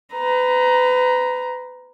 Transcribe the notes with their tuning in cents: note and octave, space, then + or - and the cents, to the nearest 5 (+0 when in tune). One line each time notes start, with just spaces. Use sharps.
B4 +35 A#5 +10